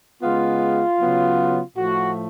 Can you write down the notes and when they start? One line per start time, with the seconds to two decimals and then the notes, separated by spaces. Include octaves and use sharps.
0.22 C#3 G#3 B3 F4
0.99 C#3 F#3 B3
1.75 A2 F3 A3 F#4